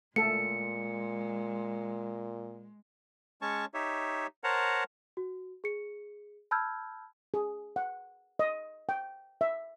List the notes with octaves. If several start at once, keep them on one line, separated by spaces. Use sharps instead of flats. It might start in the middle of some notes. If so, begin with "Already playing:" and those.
A#2 G#3 A3 A4 C#7
G#3 C#4 C#5 A5 C#6
D#4 G4 C#5 E5
A#4 C5 C#5 F#5 A5 A#5
F#4
G#4 C#7
A5 B5 E6 F6 G6 G#6
G#4
F#5
D#5
G5
E5